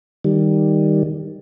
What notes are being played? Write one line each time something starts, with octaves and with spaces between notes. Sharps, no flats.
D#3 G3